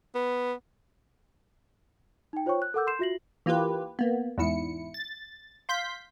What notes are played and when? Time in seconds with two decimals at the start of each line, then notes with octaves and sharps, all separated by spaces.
0.15 B3
2.33 D#4 G5
2.46 F4 C5 C#5 G5 C#6
2.62 F#6
2.74 A4 A#4 F#5 D6 E6 G6
2.87 C6 G6 C7 E7
2.99 F4 F#4 E5 A#6 C7 F#7
3.46 E3 A#3 F4 G4 B4
3.99 A#3 B3
4.38 E2 G#2 E4 C#7
4.94 A6
5.69 F5 C6 G6 B6